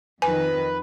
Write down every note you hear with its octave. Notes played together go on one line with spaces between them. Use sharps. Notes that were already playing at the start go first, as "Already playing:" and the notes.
F2 D#3 B4 G#5